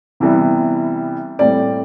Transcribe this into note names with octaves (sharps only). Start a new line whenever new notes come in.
C3 E3 G3 B3
A2 G3 C4 D5